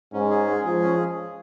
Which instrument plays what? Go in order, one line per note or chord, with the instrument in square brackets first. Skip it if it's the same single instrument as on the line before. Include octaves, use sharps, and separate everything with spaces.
[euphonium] G#2 [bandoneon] C#4
[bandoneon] G#4
G#3
[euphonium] F3 [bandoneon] G#4
[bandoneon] C#4